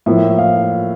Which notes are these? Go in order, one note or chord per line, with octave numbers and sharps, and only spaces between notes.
A2 F3 A#3 E5
F5